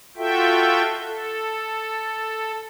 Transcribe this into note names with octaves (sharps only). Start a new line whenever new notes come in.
F4 F#4 A4 E5 G5
A4